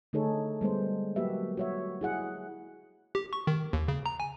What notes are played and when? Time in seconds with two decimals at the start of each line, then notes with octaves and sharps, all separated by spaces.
0.13 D3 A3 D#4 G#4 A4 C#5
0.61 G3 G#3 B3 C5
1.16 F#3 A#3 F#4 G4 B4 E5
1.57 F#4 C#5 E5
2.01 E4 G#4 F#5
3.15 G4
3.33 C#6
3.47 D#3
3.73 D#2
3.88 C#3
4.06 A#5
4.20 G#5